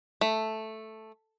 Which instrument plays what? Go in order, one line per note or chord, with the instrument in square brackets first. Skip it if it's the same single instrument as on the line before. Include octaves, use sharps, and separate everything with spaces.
[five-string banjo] A3